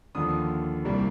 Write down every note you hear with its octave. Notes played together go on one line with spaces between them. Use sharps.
D#2 D3 F3 A#3 D#6
C2 C3 G3 A#3